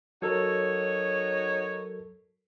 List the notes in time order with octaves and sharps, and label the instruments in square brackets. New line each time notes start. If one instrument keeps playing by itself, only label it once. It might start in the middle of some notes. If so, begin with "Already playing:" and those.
[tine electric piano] F#3 A4 A#4 [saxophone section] D#4 F#4 C#5